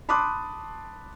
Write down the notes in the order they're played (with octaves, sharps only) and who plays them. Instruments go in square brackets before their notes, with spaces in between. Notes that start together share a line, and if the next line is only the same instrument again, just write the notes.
[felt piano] A5 B5 C6 D6 D#6 F#6